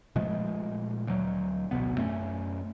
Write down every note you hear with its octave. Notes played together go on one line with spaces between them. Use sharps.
A#2 F3 G#3 A3
D2 F#3
A1 D2 B2 B3
F#2 A3 C4 C#4